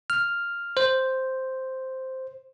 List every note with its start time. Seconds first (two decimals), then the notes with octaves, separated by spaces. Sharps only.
0.10 F6
0.77 C5